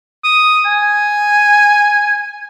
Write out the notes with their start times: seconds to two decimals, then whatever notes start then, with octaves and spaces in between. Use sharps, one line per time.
0.24 D#6
0.66 G#5